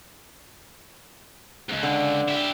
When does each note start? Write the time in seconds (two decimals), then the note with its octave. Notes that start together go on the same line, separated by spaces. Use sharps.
1.69 C#2 G#2
1.83 D3
2.29 E4 G4